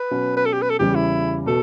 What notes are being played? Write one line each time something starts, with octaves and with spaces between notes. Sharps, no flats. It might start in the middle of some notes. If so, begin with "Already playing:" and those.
Already playing: B4
B2 F#3 C#4 F#4
B4
A4
G4
B4
A4
E2 C#3 G3 C#4 G4
E4
B2 A4